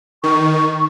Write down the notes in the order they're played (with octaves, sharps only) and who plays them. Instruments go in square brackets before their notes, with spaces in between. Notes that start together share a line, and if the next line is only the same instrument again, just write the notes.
[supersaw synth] D#3 [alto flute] C#6